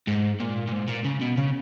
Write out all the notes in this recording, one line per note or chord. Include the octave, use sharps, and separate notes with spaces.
G#2
A#2
A#2
G#2
A#2
C#3
B2
C#3